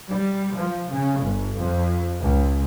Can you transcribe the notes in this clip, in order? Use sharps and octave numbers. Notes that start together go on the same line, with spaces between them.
G3
F3
C#3
G1
F2
C#2